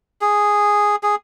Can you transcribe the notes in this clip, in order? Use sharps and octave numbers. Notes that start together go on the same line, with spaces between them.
G#4
G#4